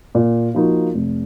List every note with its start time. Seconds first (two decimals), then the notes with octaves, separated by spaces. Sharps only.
0.15 A#2
0.55 F3 A#3 D#4 F#4
0.94 F1